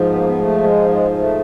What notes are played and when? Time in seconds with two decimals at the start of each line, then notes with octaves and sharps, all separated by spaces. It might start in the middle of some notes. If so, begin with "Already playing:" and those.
Already playing: G#2 F3
0.10 B3
0.18 A#3
0.25 B3
0.38 A3
0.63 G#3
0.90 G#3
1.11 G#3
1.17 A3